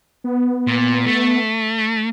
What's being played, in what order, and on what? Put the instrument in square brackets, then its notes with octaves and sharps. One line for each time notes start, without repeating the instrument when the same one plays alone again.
[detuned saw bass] B3
[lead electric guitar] A#2
A3